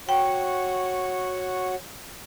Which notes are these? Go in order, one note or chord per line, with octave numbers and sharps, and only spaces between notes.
F#4 C#5 F#5 G5